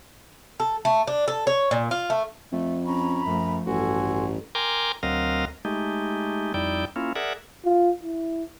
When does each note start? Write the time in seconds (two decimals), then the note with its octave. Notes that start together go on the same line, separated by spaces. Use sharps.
0.60 A4
0.85 A3
1.07 D4
1.28 A4
1.47 C#5
1.71 A#2
1.91 F4
2.10 A3
2.52 F2 A3
2.86 C#4 A#5 B5
3.25 F#2 F3 A3
3.66 A1 G2 F#4 A4 G#5 C6
4.55 A#4 G5 G#5 A#5 C6 D6
5.03 D2 F#3 C4 A#4 D#5 F5
5.65 G#3 A3 D#4 G4
6.54 F2 G3 D#4 E4 D5 G5
6.96 A#3 C#4 E4 F4
7.15 G#4 A#4 D5 E5 F#5
7.65 F4
8.04 E4